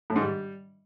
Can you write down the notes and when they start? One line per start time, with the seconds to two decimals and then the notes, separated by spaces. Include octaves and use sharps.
0.10 A2
0.16 G#2
0.21 G3